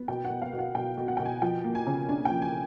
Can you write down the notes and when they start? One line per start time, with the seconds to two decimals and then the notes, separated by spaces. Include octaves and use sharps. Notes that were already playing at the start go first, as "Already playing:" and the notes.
Already playing: B3
0.08 B2 G5
0.25 F#5
0.30 B2
0.42 F5
0.53 B2
0.59 F#5
0.75 B2 G5
0.98 B2
1.08 F#5
1.17 B2 G5
1.25 G#5
1.42 F3 G5
1.64 A#3
1.75 G#5
1.87 C#3
2.09 D4 G#5
2.25 G5
2.31 F3
2.42 G#5